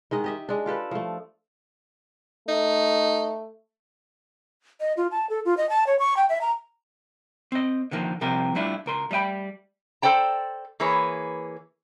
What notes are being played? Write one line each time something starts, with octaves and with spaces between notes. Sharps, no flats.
D#3 G#3 D#5 F#5
G4 D#5 E5
G#3 D4
F4 G4 A4 B4
F3 A3
A3 D#4
D#5
F4
A5
A4
F4
D#5
A5
C#5
C#6
G5
E5
A#5
C4 D#5
D3 D#3 F3 A#3
C2 C3 F3 G4 A#4
G3 A3 D4 E4 F4
C#2 A#4 C6
G3 A3 D#5 G5 B5
A4 C5 D5 G5 A#5
E3 A#3 G#4 B4 C#5